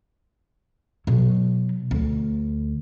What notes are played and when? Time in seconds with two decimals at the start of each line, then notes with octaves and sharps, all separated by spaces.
1.07 B2 F#3
1.91 D2